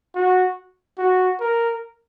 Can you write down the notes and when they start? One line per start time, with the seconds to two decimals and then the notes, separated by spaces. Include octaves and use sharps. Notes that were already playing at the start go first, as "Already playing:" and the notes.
0.15 F#4
0.98 F#4
1.40 A#4